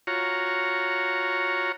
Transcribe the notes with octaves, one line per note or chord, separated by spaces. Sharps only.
F4 F#4 C#5 A#5